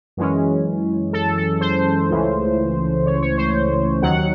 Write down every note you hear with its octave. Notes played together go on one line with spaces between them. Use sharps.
F#2 E3 G#3 C#4
A4
A4
C5
C#2 C#3 E3 A3 C#4
C#5
C#5
C5
D#2 D#3 F#3 F#5
F#5